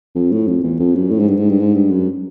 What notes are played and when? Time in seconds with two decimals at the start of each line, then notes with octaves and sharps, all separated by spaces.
0.15 F2
0.32 A2
0.47 F2
0.63 E2
0.79 F2
0.95 F#2
1.11 A2
1.19 G#2
1.28 G2
1.37 G#2
1.49 G2
1.59 G#2
1.75 G2
1.91 F#2